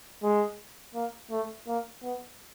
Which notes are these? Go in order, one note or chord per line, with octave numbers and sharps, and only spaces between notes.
G#3
A#3
A3
A#3
B3